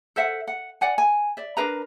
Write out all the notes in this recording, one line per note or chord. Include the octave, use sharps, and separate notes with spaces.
A4 C5 E5 F#5
F#5
D5 F#5 G#5
G#5
D5 E5
D4 A#4 B4 A#5